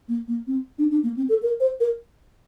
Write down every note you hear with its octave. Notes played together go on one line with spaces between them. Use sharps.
A#3
A#3
C4
D4
D4
A#3
C4
A4
A#4
C5
A#4